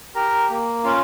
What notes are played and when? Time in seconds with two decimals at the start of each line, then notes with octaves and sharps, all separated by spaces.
0.15 G4 A#4 A#5
0.49 A#3
0.84 C#4 F4 F5